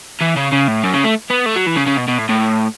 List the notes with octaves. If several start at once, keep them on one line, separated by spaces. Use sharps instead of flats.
E3
C#3
C#3
A2
F#2
C#3
A3
B3
A3
F#3
E3
C#3
C#3
B2
B2
A2
A2